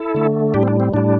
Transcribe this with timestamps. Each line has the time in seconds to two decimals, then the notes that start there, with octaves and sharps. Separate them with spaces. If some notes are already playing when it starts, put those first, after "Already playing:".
Already playing: E4 A4
0.14 D3 A3
0.54 A2 G3 D4 G4
0.63 C4
0.68 D4
0.80 C4
0.93 A2 G3 D4